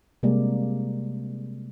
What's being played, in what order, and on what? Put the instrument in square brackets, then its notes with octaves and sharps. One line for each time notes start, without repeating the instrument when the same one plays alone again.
[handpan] C3 G3 G#3 A#3 D5